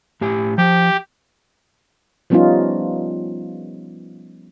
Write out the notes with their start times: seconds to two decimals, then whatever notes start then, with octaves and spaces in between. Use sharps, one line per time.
0.21 A2 G4 G#5
0.58 F3 G4
2.30 F3 G3 B3 C#4 D#4 F4